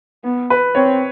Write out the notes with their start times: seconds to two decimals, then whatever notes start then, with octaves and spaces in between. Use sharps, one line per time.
0.24 B3
0.50 B4
0.75 C4 C#5